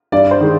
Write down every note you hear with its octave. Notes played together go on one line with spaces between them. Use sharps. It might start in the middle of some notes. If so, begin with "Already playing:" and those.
G2 D5
C5
D#3 G#3